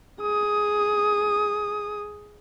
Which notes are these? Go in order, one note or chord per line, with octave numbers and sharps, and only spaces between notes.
G#4 D#6